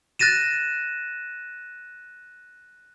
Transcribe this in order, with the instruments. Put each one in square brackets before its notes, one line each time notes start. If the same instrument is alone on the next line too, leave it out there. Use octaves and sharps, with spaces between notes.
[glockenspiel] F#6 A6 A#6 D#7 E7